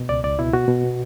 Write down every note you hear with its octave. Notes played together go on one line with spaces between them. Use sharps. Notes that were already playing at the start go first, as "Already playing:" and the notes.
Already playing: B2
C#2 D5
C#2 D5
B2 E4
B2 F#4
B2
B3